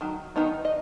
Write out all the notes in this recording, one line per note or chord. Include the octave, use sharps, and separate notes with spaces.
D#3 F#3
D#3 F#3 B3 D#4
D#5